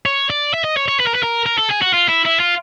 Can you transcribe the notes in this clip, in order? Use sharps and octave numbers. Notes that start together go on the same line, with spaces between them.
C#5
D5
E5
D#5
C#5
C#5
B4
A#4
B4
A#4
A#4
A4
G#4
F#4
F4
E4
E4
F4